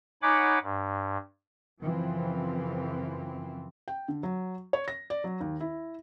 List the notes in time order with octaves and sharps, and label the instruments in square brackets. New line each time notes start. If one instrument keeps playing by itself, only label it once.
[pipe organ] D#4 C#5 F#5 G#5 B5 D6
G2
[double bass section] F#2 C#3 E3 F3 C4
[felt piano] G5
D3
F#3
C#5
A#6
D5
F#3
D#2
E4